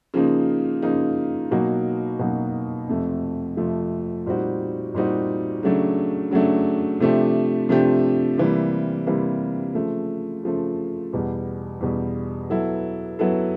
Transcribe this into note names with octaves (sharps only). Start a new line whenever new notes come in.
C#3 F3 A#3 D#4
C#3 F3 A#3 D#4
B2 F#3 A#3 D#4 F#4
B2 F#3 A#3 D#4 F#4
F2 C3 F3 A3
F2 C3 F3 A3
A#2 G3 C4 D#4 F#4
A#2 G3 C4 D#4 F#4
C#3 F#3 A3 D4
C#3 F#3 A3 D4
C3 F3 A3 D4 G4
C3 F3 A3 D4 G4
C3 E3 G3 A#3
C3 E3 G3 A#3
C#3 F3 A3
C#3 F3 A3
E2 B2 G3
E2 B2 G3
F#3 B3 E4 A4
F#3 B3 E4 A4